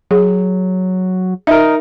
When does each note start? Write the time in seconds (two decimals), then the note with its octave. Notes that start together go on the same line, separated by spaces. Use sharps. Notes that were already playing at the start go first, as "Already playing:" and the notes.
0.11 F#3 G#4
1.47 D#4 A#4 E5